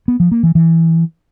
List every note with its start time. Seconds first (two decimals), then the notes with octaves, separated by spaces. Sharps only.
0.08 B3
0.20 F3
0.32 A#3
0.43 E3
0.55 E3